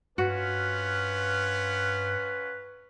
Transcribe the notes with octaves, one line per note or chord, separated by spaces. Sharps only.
G2 C#4 F4 F#4 B4 F#5